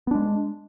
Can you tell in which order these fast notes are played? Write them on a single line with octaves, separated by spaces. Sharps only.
B3 D4 G#3